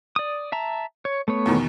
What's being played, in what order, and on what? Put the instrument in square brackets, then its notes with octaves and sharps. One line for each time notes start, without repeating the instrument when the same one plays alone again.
[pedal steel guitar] D5 D#6
E5 A5 A#5
C#5
A3 B3 C#5
[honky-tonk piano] E2 B2 D#3